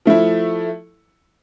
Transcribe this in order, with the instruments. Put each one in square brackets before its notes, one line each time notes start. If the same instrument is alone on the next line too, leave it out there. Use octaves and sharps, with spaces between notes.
[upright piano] F3 A3 E4